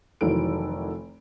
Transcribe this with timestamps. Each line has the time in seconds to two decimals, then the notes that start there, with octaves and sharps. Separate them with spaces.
0.21 F1 D#3 E3 F#3 A4 D7